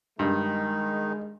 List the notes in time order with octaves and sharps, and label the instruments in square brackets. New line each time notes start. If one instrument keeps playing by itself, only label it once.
[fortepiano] G2 [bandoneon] D#3 D#4 [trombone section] G#3